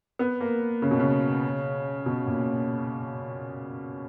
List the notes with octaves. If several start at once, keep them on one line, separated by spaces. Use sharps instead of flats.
B3
A#3
C#3
B2
C#3
B2
A#2